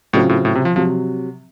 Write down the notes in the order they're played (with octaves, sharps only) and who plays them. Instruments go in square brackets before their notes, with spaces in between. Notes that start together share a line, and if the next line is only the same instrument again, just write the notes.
[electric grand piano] A2 [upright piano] C#3 F#3 C4 F4
[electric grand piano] A2
A2
C3
F3
[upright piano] C3 F#3 [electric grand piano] F3